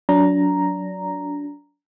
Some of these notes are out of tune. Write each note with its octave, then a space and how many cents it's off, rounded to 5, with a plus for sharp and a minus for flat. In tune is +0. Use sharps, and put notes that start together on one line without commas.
F#3 -10 D4 -30 A#5 +0